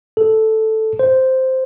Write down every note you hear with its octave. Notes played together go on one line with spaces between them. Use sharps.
A4
C5